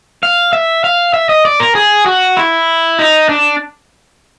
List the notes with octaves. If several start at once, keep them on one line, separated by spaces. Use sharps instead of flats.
F5
E5
F5
E5
D#5
D5
A#4
G#4
F#4
E4
D#4
D4